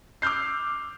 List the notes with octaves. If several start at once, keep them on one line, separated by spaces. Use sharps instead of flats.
D6 E6 F6 G6 C7